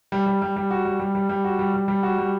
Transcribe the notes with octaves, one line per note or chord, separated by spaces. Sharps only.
G3
G3
G3
G3
F#4
G3
G3
G3
G3
F#4
G3
G3
G3
F#4
G3